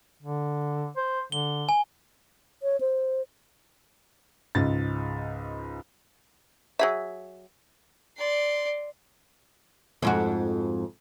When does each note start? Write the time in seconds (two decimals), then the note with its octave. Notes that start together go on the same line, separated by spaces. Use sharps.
0.23 D3
0.97 C5
1.32 D3 G7
1.69 G#5
2.63 C#5
2.80 C5
4.55 C#2 G#2 A6
6.79 F#3 G#4 E5
8.17 D5 C6
10.02 F2 G#2 F#4